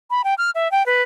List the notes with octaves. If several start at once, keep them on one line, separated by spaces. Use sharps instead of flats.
B5
G5
F6
E5
G5
B4